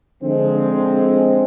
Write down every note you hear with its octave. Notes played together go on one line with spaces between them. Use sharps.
D3 F3 G#3 C4